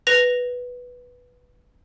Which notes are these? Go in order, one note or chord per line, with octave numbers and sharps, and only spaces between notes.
B4 A#6 F7